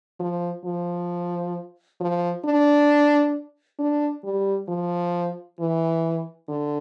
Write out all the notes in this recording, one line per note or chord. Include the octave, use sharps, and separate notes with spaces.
F3
F3
F3
D4
D4
G3
F3
E3
D3